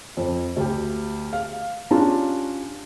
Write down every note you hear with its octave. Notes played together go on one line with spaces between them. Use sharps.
F2
D2 G4
F5
C#4 D4 F4 G4 A5 A#5